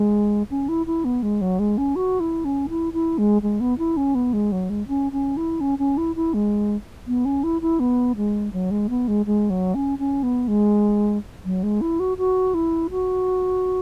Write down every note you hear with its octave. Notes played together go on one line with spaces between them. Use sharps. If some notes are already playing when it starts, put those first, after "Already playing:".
Already playing: G#3
C#4
E4
E4
B3
G#3
F#3
G#3
C#4
F#4
E4
C#4
E4
E4
G#3
G#3
B3
E4
C#4
B3
G#3
F#3
G#3
C#4
C#4
E4
C#4
C#4
E4
E4
G#3
B3
C#4
E4
E4
B3
G#3
F#3
G#3
B3
G#3
G#3
F#3
C#4
C#4
B3
G#3
F#3
G#3
E4
F#4
F#4
E4
F#4